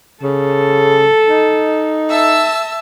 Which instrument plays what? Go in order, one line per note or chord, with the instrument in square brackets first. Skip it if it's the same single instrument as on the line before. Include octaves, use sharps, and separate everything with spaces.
[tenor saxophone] C#3 [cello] A4
[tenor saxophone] D#4
[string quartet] E5 A5 E6